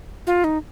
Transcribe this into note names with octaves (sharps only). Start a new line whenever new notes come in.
F4
D#4